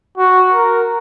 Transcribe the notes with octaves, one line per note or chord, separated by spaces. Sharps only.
F#4
A#4